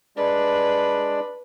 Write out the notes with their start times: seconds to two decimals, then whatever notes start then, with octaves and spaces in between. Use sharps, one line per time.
0.17 G#3 D4 B4 D5